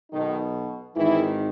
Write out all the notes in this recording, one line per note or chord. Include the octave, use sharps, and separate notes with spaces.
B1 B2 D#3 D#4
G#1 G#2 D#3 E3 E4